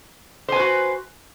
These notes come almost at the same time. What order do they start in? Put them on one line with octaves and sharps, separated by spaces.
C5 G#5 B4 F#4